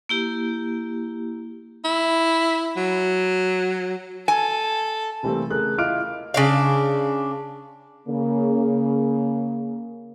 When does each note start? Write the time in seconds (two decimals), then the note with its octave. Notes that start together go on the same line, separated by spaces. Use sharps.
0.09 A#3 E4 G4
1.85 E4
2.77 F#3
4.28 A4 G#5
5.23 C3 E3 G3 A3 A#3 C4
5.51 C#3 A3 G#4 A#4 F#6
5.78 E4 F4 D#5 D6 F6 D7
6.34 C#3 D4 F5
8.08 C#3 A#3